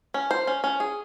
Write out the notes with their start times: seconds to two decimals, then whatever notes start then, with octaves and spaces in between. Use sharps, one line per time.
0.14 C#4
0.31 C5
0.47 C#4
0.64 C#4
0.80 G#4